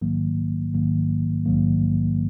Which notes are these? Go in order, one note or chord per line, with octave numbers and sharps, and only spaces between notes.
A#1 G#2 D#3 F#3 A#3
A#1 G#2 D#3 F#3 A#3
A#1 G#2 D#3 F#3 A#3